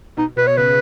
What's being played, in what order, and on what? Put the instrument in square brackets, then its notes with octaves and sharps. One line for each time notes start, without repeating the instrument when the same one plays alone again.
[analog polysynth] B2 [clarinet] D#4
[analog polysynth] B2 [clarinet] B4
[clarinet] C#5
[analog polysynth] C#3 [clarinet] B4